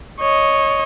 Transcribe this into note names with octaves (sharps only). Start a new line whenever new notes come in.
C#5 D#5